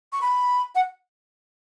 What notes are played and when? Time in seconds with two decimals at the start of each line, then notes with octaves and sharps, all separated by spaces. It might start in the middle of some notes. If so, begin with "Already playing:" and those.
0.13 C#6
0.21 B5
0.75 F#5